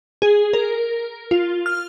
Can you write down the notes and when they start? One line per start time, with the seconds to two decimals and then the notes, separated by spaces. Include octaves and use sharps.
0.22 G#4
0.53 A#4
1.31 F4
1.66 F6